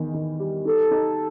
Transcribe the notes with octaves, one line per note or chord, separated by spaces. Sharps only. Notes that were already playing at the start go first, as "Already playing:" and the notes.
Already playing: E2 D#3 E3
D#3
G3
D#4 A4
D#4